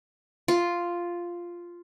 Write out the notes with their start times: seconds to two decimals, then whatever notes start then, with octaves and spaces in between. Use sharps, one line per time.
0.48 F4